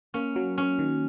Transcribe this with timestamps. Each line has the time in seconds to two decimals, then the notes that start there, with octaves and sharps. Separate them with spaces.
0.14 A#3 C#4
0.36 F#3
0.58 C#4
0.79 D#3